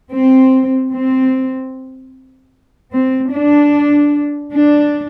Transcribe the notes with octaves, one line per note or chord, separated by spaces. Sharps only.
C4
C4
C4
D4
D4